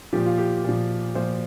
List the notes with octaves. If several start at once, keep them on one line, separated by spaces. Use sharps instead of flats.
A#2 F3 G4
F4
G4
A#2 F3
A#2 F3 C5